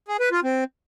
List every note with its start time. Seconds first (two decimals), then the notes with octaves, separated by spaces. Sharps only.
0.08 G#4
0.20 B4
0.32 F4
0.44 C4